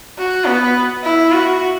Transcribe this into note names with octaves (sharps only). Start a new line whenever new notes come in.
F#4
B3
E4
F#4